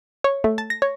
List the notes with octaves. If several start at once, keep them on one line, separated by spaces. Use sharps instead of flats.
C#5
A3
A5
A#6
C#5